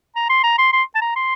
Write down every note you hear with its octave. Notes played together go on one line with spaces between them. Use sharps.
A#5
C6
A#5
C6
C6
A5
A#5
C6